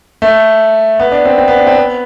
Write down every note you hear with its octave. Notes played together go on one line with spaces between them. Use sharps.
A3
B3
D4
C4
C4
B3
D4
C4
B3